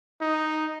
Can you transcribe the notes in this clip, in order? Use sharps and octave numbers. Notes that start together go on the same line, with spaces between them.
D#4